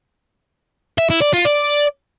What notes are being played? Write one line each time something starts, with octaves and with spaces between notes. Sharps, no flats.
E5
E4
D5
F4
D5